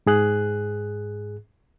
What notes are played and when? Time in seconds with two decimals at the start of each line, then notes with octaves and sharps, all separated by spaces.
0.06 G#2 G#4 F#6